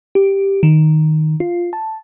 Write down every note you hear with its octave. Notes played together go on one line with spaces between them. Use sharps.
G4
D#3
F4
A5